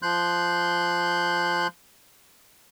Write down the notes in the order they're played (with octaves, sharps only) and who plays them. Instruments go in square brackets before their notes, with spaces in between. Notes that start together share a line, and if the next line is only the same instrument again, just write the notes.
[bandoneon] F3 C6 F#6 G6